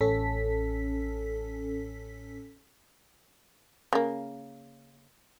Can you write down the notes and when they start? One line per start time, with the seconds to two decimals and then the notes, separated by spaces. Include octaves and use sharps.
0.01 A1 C#4 A4 B6
3.93 C#3 A#3